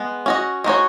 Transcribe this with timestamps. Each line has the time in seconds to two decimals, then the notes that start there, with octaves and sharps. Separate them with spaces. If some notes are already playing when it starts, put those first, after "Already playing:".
Already playing: G#3 B3
0.26 C#4 F#4 D#5
0.64 G#3 D#4 F#4 C#5